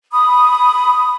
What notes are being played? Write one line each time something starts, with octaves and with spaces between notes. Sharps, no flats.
B5 D#6